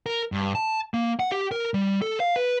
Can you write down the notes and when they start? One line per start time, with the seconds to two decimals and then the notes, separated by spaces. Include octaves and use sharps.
0.06 A#4
0.32 G2
0.55 A5
0.94 A#3
1.20 F#5
1.32 G4
1.51 A#4
1.74 G3
2.02 A4
2.20 F5
2.36 B4